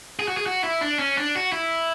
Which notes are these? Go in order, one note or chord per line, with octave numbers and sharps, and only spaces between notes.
G#4
F#4
G#4
F#4
E4
D4
C#4
D4
F#4
E4